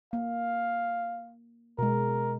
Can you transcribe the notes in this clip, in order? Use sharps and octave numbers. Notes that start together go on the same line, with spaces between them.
A#3 F5
B2 G#3 A#4